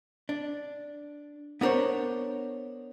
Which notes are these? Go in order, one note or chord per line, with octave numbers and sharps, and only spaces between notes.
D4
B3 D4 A#4 C5 C#5